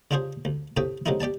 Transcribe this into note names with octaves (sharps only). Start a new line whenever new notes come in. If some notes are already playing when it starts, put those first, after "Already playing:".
C#3 D4 F4 G4 G#4 C5
D2
A2 C3 A3 G5 D#6
C3 F#3 G#3 A3 D#4 E4
G4 D5 G#5 A5